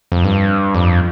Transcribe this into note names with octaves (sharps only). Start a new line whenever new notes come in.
F2
G2
F2